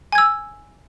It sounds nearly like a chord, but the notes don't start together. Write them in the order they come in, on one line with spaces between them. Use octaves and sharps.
G#5 G#6 E6